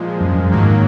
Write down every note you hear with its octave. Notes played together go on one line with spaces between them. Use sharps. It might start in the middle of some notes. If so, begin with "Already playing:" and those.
Already playing: A#2 F3 G#3
F#2
F#2
G#2 D#3 F#3 A#3